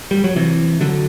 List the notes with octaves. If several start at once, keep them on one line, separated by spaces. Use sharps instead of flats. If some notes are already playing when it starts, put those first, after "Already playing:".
G3
F#3
C3 E3
D3 F#3